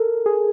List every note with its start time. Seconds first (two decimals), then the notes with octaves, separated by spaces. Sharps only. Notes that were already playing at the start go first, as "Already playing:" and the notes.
Already playing: A4 A#4
0.26 G#4